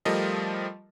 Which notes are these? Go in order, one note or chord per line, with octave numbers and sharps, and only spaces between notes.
F3 G3 A3 F4 A#4 D#5